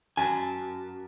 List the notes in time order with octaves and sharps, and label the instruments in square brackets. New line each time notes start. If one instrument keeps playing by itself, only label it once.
[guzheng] F#2 [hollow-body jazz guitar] G#5 [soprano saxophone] A5